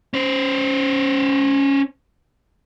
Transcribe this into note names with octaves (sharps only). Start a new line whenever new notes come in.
C#4 C5